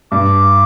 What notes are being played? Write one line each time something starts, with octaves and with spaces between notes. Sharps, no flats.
G2 D6